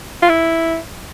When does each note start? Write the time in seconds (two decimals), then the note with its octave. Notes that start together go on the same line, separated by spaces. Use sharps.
0.22 F4
0.29 E4